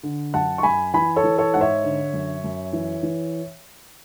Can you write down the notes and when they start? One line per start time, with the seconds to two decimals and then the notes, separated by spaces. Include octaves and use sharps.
0.03 D3
0.34 F#2 F#5 A5
0.58 C#6
0.63 F#2 G#5 B5
0.94 E3 G#5 B5
1.16 A4 C#5
1.24 E3
1.38 A4 C#5
1.54 G#2 F#5
1.61 C#5 E5
1.84 D3
2.13 F#2
2.44 F#2
2.73 E3
3.03 E3